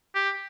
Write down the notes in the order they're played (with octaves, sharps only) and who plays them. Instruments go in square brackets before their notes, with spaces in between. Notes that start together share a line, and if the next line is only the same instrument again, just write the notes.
[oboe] G4